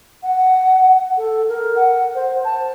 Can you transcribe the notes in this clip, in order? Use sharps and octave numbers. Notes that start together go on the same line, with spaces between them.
F#5
A4
A#4
F#5
C5
A5